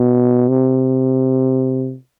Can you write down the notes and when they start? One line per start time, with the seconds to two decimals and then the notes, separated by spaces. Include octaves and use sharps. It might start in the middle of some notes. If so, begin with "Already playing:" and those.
Already playing: B2
0.50 C3